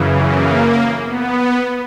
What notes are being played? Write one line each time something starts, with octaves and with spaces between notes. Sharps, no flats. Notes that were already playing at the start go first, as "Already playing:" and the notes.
Already playing: F#2 C#3 E3
A#3
B3